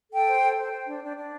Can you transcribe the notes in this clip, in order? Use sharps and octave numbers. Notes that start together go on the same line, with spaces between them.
A4 G5
C5
A4
C5
C5
D4
D4
D4